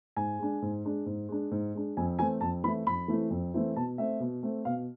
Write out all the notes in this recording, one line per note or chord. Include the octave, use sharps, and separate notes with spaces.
G#2 G#5
G#3 D4
G#2
G#3 D4
G#2
G#3 D4
G#2
G#3 D4
F2 G#5
E3 A3 C4 E4 G#5
F2 A5
E3 A3 C4 E4 B5
F2 B5
E3 A3 C4 E4
F2
E3 A3 C4 E4
B2 A5
A3 C4 E5
B2
A3 C4
B2 F5